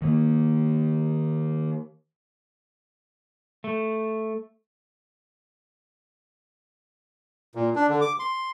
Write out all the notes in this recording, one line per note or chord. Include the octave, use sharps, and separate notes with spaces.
D#3 A#3
A3
A#2
D4
D3
D6
C6